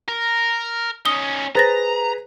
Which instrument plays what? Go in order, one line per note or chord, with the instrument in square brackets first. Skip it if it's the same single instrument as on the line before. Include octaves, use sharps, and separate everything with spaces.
[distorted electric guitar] A#4
[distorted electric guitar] C#4 D#4 [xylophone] D#6 G7
[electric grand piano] G#4 B4 [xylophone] C5 A6 A#6 [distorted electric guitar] A#5